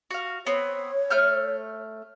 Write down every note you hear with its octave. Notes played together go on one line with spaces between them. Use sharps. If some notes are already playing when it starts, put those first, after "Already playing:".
F#4 F5
B3 C4 C#5
A3 F6 G6